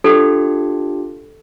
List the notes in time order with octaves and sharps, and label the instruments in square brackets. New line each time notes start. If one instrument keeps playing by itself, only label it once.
[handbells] D4 F4 G4 [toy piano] A4